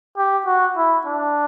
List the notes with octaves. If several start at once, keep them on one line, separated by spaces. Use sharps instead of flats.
G4
F#4
E4
D4